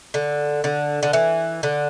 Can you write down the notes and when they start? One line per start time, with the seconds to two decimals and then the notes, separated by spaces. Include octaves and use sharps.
0.14 D3
0.64 D3
1.03 D3
1.13 E3
1.63 D3